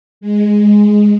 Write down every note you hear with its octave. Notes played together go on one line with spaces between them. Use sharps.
G#3